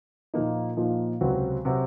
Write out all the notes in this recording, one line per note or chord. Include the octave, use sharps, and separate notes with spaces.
A#2 F3 A#3 D#4
A#2 F3 A#3 D#4
C#2 C3 F#3 C4 F#4
C3 F#3 C4 F#4